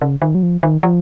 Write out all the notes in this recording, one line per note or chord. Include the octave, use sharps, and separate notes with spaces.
C#3
D#3
F#3
F3
D#3
F3